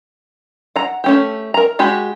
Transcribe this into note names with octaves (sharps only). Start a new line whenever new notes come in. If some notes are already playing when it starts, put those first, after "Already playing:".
F#5 A#5
A3 C#4 G4
A#4 A#5
G#3 F#4 G4 B5